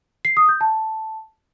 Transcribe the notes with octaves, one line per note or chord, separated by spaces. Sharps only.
C7
D#6
G6
A5